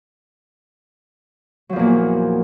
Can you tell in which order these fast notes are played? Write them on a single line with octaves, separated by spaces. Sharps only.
F#3 F3 E2 A#2